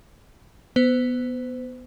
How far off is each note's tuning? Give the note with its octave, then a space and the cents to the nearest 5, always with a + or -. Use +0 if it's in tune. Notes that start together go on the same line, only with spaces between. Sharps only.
B3 +0 C5 -35